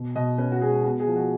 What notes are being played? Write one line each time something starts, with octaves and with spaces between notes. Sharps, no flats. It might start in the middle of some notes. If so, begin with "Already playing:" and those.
Already playing: B2
B2 D#5
C#4 B4
F#4
G#3 G#4
B3 F#4
G#4
F3
F#4